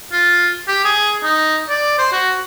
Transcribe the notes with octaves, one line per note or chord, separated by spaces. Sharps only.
F4
G4
G#4
D#4
D5
C5
F#4